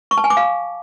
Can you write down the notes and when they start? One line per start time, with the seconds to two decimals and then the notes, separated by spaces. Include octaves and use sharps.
0.11 C#6
0.18 A5
0.24 G#5
0.30 D6
0.37 F5